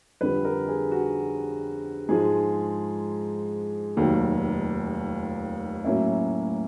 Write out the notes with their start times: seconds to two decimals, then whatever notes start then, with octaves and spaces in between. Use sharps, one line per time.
0.21 F2 D3 G3 B4
0.45 A#4
0.68 G#4
0.91 F#4
2.08 G#2 F3 G#3 G#4
3.97 F1 D#2 D#3 F#3
5.84 A2 F#3 A#3 C#4 E4